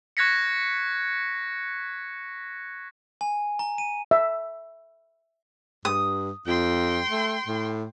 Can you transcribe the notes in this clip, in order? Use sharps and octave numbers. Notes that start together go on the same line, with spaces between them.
C#6 F#6 G#6 A#6 B6 C#7
G#5
A#5
D#7
E5
G2 D#6
F2 G5 C6
A3
A2